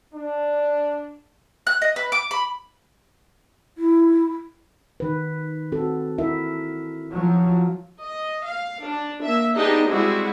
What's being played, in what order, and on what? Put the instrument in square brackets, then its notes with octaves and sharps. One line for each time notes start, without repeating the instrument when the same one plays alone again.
[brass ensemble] D4
[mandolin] F#6
D#5
B4
D6
B5
[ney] E4
[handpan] D#3 B4
C4 F#4 A4
E4 A#4 E5
[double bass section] F3 F#3
[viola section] D#5
F5
D4
A#3 E5
B3 D4 D#4 G4 G#4 D#5
G3 G#3 C4 E4 F#4 G#4